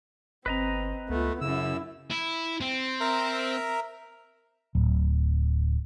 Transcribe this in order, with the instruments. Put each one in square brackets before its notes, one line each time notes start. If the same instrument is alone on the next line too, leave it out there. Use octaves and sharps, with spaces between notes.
[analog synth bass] G1 [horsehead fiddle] C4 [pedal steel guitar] B4 D#5 A#5
[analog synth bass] C#2 [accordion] A3 [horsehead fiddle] B3 F4
[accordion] F#2 E6 [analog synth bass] C#3 [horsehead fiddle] C#4 E4
[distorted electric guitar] E4
C4
[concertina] A#4 E5 A#5
[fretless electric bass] D1